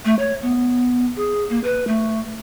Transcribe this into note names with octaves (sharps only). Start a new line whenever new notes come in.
A3
C#5
B3
G#4
A#3
B4
A3